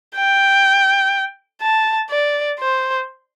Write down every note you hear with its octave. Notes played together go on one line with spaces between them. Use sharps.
G5
A5
D5
C5